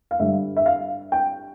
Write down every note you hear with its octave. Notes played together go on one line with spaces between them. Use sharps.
F5
G2 D3 G3 E5
E5
F5
G5